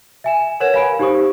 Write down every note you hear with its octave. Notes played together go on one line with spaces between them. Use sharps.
E5 G#5 E7
A#4 B4 C#5 F#5 G#6 E7
F5 G#5 B5 D7
D#4 G4 C5 C#6 D#6